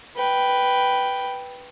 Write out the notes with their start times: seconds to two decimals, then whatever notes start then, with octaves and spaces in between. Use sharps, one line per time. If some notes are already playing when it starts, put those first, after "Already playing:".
0.16 B4 G5